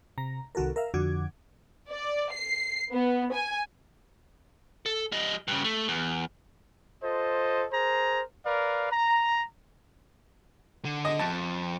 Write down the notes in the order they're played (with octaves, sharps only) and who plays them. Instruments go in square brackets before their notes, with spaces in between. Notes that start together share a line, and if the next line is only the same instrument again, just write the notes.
[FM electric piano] C3 A#5
C2 D#3 F#4 A4 A#4
A#4 E5 F5
F2 D3 F#4 D6 G#6
[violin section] D5
C7
B3
G#5
[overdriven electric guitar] A4
G3 D#5
G2 C#3
A3
E2
[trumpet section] F4 A4 C5 D#5
G#4 A#4 C5 A#5
A#4 B4 D5 F5
A#5
[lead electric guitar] D3
[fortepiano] D#5
[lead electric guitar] F2 [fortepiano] A5